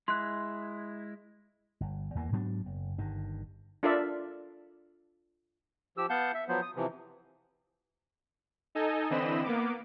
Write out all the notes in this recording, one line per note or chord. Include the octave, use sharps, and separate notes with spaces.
G#3 E4 C6 F#6
G1
E2 E3 A#3
G#2 F#3 B3 D4
F#1
G1 G2 D#3
D4 F4 A4 A#4 D5 E5
F3 G4 E6
B3 F5 F#5 A5 G6
E5
F3 F#3 B3 C5
D#6
C3 E3 F3
D#4 A4 D#5 G#5
D3 E3 C4 D#5 B5 E7
A#3 B3 D6